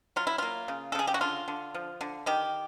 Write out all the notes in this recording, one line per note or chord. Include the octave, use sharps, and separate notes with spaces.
F#3 F4
E4
A#3 F4
C#3
A4
C#3 G#4
G4
F#4
D3 F4
D3
F3
D3
D#3 G4